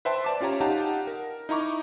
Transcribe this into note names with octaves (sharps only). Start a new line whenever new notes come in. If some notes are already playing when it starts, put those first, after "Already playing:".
B4 C5 E5 G5 A5 C6
D5 A5 D6
C#4 F4 G4 C#5 A#5
D#4 G4 F5 F#5 A5 A#5
A#4
D#4 E4 A#5 C#6 D6